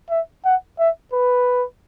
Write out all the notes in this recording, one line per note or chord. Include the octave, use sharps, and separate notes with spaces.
E5
F#5
E5
B4